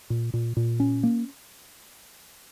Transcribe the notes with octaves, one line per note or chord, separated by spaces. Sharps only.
A#2
A#2
A#2
C#4
A#3